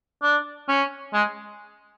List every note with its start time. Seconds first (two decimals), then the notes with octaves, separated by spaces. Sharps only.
0.22 D4
0.68 C#4
1.14 G#3